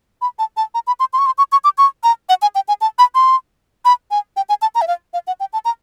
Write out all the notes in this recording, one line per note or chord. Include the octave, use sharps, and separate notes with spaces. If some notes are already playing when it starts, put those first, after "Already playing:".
B5
A5
A5
A#5
B5
C6
C6
C#6
C6
C#6
C#6
D6
C#6
A#5
F#5
G#5
G5
G#5
A5
B5
C6
B5
G#5
G5
G#5
A5
A#5
E5
F5
F5
F#5
G5
A5
A#5